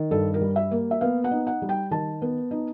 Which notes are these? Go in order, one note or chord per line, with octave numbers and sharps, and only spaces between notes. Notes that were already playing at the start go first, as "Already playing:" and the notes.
Already playing: D#3
G2 A4
A#4
G3
E5
A#3
E5
B3 F5
F#5
D#4
F#5
G3
G5
D#3 A5
B3
D#4